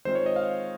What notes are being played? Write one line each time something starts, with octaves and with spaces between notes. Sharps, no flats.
D#3 G#3 C4 F4 C5
C#5
D#5
F5